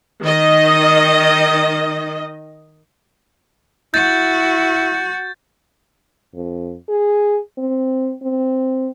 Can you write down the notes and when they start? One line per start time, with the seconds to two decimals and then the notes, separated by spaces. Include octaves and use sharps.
0.22 D#3 D#5
3.94 E4 F#4 G6 A6
6.35 F2
6.89 G#4
7.58 C4
8.23 C4